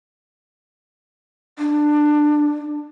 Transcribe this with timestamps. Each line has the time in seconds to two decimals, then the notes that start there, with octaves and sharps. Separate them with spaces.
1.59 D4